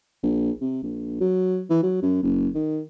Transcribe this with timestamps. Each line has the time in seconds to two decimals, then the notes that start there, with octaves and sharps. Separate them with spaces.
0.23 A#1
0.61 C3
0.83 A#1
1.21 F#3
1.70 E3
1.83 F#3
2.02 F#2
2.23 F#1
2.55 D#3